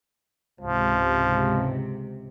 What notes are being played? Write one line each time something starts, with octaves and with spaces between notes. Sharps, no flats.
C#2 G#2 C3 F3